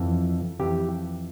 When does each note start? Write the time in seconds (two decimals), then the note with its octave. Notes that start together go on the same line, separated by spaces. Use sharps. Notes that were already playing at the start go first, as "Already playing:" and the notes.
Already playing: F2 E3
0.59 F2 E3 G4